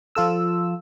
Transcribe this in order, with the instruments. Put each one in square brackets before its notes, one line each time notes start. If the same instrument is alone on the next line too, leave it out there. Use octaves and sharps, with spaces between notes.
[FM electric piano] F3 F4 A4 E6